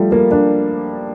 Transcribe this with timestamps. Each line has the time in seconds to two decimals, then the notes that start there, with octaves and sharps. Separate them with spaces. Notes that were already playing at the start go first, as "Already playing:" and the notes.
Already playing: F3 G3 A3
0.12 A#3
0.31 D4